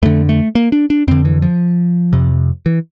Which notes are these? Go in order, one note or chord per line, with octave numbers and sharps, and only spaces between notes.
F2 D3 A3
A3
A#3
D4
D4
F2 D3 C4
E3
F3
F2 C3
E3